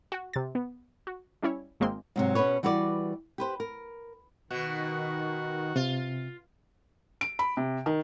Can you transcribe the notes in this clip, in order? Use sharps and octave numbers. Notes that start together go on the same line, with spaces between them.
F#4 F#5
C3 A6
B3
F#4
G3 C#4 E4 C#5
G#1 G#3 A#3 C4 C6
G#2 C3 F#3
B2 C#4 G#4 B4 C#5
E3 G3 F#4 B4 C#5 D5
G4 B4 C5
A#4
B2 D#3 F#4
C3 F4
D7
B5
C3
D#3